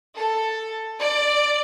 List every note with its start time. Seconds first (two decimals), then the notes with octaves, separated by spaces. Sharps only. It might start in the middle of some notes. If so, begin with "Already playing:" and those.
0.16 A4
1.00 D5